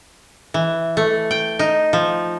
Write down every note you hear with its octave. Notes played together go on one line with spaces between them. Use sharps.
E3
A3
G5
D#4
F3